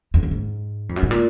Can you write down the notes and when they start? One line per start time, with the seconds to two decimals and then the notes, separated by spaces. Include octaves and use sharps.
0.14 F2
0.23 F#2
0.31 G#2
0.89 F2
0.96 F#2
1.03 G#2
1.11 A#2